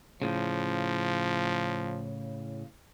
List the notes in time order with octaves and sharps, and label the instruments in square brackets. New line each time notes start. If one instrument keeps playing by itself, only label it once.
[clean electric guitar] A2 C#3 [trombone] F3